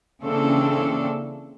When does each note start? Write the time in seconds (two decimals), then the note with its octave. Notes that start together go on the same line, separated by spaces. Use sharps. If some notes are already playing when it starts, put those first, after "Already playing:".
0.22 C#3 E3 A#3 C4 D4 A4